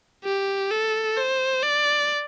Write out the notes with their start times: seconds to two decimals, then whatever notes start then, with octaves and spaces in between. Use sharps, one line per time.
0.24 G4
0.71 A4
1.17 C5
1.63 D5